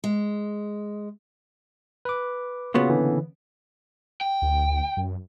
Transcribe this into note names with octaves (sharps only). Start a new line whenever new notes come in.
G#3
B4 D6
A#2 C#3 B3 F4 F#4 G#4
D3 E3
G5
D2
F#2